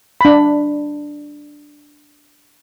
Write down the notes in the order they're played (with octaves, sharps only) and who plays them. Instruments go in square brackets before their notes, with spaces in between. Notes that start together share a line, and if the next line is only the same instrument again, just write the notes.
[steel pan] D4 B5